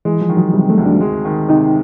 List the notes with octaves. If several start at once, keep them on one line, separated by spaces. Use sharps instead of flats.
E3 G#3
F3
D#3
F#3
C3 G3
A3
D2
D4
G#3
D#3
C3 D#4